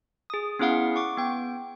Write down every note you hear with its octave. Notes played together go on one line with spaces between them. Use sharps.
G#4 D#6
B3 C#4 E4 G#4 F5 F#5
C#6 D6
B3 G5